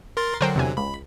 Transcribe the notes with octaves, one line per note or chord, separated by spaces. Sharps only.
A#4 C6 A6
D3 F#3 A#4 C5 G5
E2 C3 G#5
C#2 B5